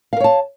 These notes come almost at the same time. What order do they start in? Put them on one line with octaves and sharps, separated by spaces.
F5 A#4 C#5 A5